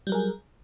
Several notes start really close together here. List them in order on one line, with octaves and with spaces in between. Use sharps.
G3 F#3 A#4 G#4